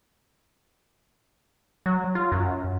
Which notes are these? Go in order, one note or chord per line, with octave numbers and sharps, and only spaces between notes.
F#3
F4
F#2